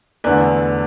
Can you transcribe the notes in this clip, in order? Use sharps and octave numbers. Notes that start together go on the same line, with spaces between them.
E2 D3 A3 B4 D5